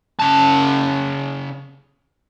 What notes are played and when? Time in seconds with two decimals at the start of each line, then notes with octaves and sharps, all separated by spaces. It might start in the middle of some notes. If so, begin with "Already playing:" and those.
0.19 C#3 A5